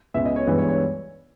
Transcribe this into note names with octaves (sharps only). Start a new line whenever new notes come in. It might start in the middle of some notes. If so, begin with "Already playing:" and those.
C#2 C#3 G#3 B3 E5
D#5
C#5
G2 E3 G#3 B3 B4
C#5
C#5